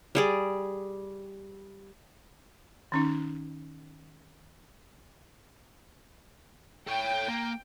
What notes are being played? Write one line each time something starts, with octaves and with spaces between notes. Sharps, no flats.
G3 G#4 D5
D#3 C#4 D#4
A4 C#5 G5
A#3